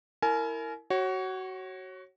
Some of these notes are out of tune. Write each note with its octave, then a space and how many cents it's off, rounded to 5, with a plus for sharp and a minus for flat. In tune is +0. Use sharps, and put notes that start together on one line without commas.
E4 +0 A#4 -20 G#5 +35
F#4 +20 C#5 -20